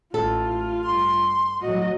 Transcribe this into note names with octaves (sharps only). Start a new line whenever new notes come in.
A1 F4 A4
G2 C6
A2 F#3 F#4 D#5